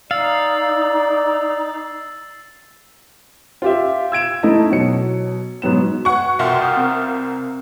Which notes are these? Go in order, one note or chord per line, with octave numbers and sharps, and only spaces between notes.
D#4 D5 F5 E6 A6 C7
F4 G4 E5
E6 G#6 D7 E7
A3 D#4 E4 A4 D#5 A5
B2 F#3 C#7
G#2 F#3 B3 E7
F#4 B4 F#5 C#6
C2 F4 E5 F#5 G5 C6
D#6 F6 G6
C4 A#4